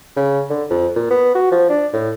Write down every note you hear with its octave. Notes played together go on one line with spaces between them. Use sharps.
C#3
D3
F2
A#2
B3
F#4
F3
D4
A2